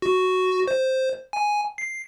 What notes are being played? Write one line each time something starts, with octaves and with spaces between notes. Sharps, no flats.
F#4
C5
G#5
C7